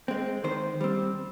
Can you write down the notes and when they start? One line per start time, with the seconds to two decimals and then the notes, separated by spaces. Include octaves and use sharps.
0.08 G#3 C4
0.44 D#3 C5
0.81 G3 C4